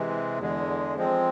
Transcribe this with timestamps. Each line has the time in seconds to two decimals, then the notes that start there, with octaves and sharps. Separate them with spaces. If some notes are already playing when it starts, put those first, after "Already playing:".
Already playing: C3 E3 G#3
0.39 E2 D3 G#3
0.96 F3 G#3 C4